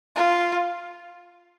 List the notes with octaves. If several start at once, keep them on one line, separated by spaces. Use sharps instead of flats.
F4